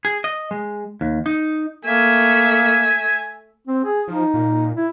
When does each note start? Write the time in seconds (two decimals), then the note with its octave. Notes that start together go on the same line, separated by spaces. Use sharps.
0.05 G#4
0.24 D#5
0.51 G#3
1.01 D#2
1.26 D#4
1.85 A3 A#3 E5 G#5
3.68 C4
3.85 G#4
4.08 F3 D#4
4.34 A#2
4.76 E4